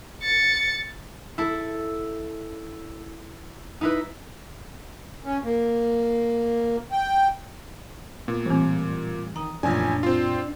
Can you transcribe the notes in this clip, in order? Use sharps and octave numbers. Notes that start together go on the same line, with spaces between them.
A6 C#7
E4 A4
D#4 E4 B4
C#4
A#3
G5
A#2 B3
A2 E3 G3 C4
D#3 A#5 D#6
A1 F#2 A#2 F3 D4 G#5
C4 F4